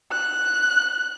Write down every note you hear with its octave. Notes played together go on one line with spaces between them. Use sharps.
F#6